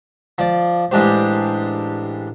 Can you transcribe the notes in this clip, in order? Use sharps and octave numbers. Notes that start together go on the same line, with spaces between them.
F3 D5
A1 G#3 D4 G4 C5